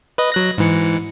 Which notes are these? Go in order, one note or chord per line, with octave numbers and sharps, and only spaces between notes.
B4 D#5
F#3 F#6 A#6
G#2 E3 C#7